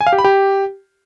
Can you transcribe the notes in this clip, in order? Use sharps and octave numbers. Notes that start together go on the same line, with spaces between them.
G#5
F5
G4
B5
G4